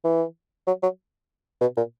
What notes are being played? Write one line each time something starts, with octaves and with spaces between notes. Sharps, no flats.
E3
F#3
F#3
B2
A#2